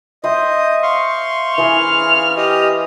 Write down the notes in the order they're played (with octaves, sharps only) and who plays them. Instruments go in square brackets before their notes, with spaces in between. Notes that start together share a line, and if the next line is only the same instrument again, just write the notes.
[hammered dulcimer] C5 E5 G5 [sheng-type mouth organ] D#5
[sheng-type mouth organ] F5 C6 C#6
[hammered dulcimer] E3 G#4 [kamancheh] F6
[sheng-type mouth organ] G4 D#5